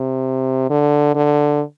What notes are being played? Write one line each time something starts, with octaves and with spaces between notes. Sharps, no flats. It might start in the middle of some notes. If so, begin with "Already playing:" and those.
Already playing: C3
D3
D3